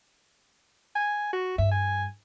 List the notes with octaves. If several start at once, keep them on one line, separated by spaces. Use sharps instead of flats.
G#5
F#4
G2 E5
G#5